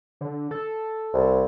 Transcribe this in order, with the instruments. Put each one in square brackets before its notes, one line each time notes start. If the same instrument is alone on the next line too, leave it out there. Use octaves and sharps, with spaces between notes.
[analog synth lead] D3
A4
[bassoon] C2